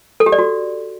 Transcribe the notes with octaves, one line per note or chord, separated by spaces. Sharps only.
A4
G4
D5
F#4